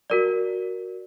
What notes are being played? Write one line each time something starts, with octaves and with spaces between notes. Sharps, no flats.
F#4 A#4 D5